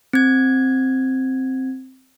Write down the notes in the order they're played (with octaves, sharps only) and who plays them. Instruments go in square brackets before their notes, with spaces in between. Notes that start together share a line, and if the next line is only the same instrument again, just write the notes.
[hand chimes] C4 G#6